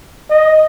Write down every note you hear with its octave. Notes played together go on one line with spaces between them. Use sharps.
D#5